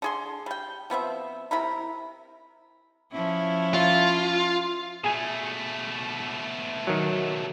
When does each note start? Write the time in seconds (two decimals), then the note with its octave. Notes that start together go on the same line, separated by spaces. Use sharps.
0.02 D3 G#4 C6
0.46 G3 G5
0.90 F3 B3 C4 E5
1.51 C3 E4 A#4 B5
3.12 F3 C#4 E4
3.74 F4
5.04 B2 A3 G#4 G#5
6.87 D#3 F#3